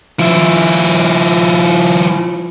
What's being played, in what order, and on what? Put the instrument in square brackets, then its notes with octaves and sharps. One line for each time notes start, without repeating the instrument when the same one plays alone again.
[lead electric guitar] F3 E4